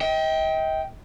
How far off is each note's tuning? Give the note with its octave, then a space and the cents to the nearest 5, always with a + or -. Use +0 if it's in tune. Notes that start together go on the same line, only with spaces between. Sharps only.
D#5 +40 G5 +0